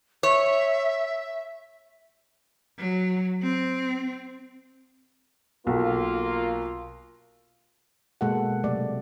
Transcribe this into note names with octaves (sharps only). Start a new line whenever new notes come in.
C#5 E5
F#3
C4
B1 A#3 F4
B2 G#3 A#3 A4 F#5
C3 F#3 A3 D5